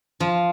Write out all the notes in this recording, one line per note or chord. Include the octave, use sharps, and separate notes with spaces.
F3